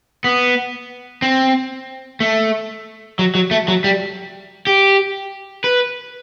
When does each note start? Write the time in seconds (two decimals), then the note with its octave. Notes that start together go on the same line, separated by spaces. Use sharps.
0.24 B3
1.22 C4
2.20 A3
3.19 F#3
3.35 F#3
3.51 A3
3.68 F#3
3.84 G3
4.67 G4
5.64 B4